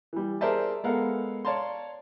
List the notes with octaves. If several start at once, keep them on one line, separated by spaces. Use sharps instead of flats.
E3 G3
G#4 A#4 C5 D5 E5 A5
G#3 B3 A4 A#4 F5 F#5
C#5 D5 F5 A5 A#5 C6